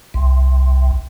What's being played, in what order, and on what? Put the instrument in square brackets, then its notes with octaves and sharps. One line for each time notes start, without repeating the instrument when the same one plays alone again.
[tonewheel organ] C2